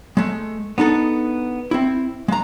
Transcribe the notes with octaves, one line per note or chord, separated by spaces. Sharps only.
G#3 A3
B3 D4 D#4 A4
C4 E4
G#3 A#5